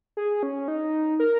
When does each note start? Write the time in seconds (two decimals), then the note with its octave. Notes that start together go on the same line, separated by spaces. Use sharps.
0.17 G#4
0.43 C#4
0.68 D#4
1.20 A#4